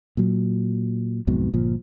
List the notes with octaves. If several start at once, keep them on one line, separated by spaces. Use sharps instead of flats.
A#2 F#3
B1 F2 G#2 B2
G1 A#2 F3